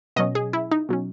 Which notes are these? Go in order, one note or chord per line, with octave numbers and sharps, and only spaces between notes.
B2 F#3 C#4 D#5
G#4
E4
D#4
B2 F#3 C#4